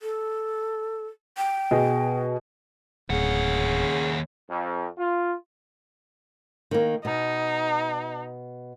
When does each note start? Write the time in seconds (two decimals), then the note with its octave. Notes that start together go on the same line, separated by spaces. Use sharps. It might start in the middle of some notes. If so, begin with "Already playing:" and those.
0.02 A4
1.38 G5
1.71 B2 G#4 D#5
3.10 D1 D#2 C#3 F#5
4.49 F2
4.98 F4
6.71 D#3 A#3
7.05 B2 D#4